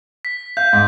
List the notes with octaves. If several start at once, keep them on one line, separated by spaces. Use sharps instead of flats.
B6
F5 G6
G#2